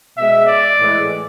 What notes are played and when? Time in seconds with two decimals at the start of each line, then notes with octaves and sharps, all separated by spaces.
0.16 B2 E5
0.22 G#3
0.46 D5
0.78 A2 E3 G#3